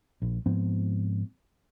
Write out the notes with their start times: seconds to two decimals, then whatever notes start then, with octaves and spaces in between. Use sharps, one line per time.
0.22 A#1
0.46 G#2 F3 B3 C4